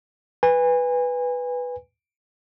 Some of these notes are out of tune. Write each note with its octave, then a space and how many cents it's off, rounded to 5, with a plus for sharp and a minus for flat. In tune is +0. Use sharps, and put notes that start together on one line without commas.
B4 +0 G#5 -30